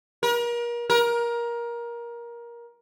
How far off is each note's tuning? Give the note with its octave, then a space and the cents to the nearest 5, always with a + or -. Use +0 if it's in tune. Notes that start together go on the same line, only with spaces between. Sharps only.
A#4 +35
A#4 +20